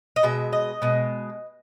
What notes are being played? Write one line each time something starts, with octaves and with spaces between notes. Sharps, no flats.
D#5
B2 G#3 E5
D#5
B2 G#3